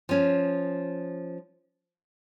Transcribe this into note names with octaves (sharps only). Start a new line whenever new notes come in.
F3 C#4